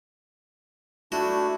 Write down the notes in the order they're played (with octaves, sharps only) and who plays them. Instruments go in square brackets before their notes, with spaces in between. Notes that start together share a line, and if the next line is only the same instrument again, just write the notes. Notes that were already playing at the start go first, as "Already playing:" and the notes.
[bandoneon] A3 D4 E4 [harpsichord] F#4